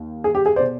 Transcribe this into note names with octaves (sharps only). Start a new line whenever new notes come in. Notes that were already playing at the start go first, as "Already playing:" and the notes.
Already playing: D#2
G#4
G4
G#4
C5 D5
B2